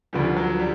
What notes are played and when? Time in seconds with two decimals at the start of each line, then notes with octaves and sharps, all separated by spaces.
0.13 D2 D3 F3 G3
0.37 F#3
0.59 G3